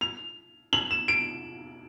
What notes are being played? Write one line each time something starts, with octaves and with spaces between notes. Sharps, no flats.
F7
F#7
E7
D7